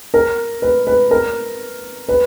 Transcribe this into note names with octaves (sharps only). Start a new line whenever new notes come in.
A#4
B4
B4
A#4
B4